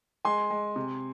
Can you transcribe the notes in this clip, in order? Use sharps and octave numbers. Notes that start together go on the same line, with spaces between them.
G#3 G#5 C6
G#3
C3